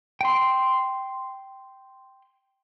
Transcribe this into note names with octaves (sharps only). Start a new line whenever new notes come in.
G5 C6